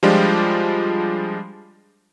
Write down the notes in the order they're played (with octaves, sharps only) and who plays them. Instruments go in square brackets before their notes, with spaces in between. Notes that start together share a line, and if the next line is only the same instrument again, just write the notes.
[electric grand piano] F3 G3 G#3 D4 F4 G4